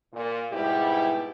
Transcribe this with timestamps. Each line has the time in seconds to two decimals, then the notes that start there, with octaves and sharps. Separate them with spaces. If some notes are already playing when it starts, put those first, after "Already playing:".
0.13 A#2
0.52 G#2 B2 G3 E4 G4